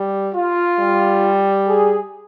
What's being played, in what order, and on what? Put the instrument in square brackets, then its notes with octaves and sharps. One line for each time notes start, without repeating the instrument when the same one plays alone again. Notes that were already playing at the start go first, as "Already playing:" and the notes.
Already playing: [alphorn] G3
[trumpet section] F4
[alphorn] G3
[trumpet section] G#4